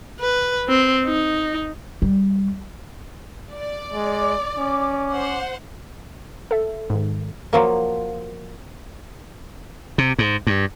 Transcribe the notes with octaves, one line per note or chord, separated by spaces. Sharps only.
B4
C4
D#4
G3
D5
G#3 D6
C#4
C5 F#5
A4 E5
G#2 D#3
F3 F#3 A#3
C3
G#2
G2